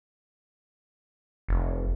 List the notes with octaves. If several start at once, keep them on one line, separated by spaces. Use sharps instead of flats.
F1